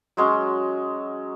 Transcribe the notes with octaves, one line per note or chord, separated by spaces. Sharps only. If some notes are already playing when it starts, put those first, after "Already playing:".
F#3 G#3 C#4